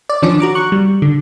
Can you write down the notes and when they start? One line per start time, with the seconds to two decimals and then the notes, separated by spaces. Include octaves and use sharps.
0.09 D5
0.22 D#3 F3 C#4 D4 D5
0.40 F#4 A#5 D6
0.55 C#6 F#6
0.72 G3
1.02 D3